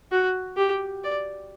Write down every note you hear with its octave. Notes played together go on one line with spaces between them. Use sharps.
F#4
G4
D5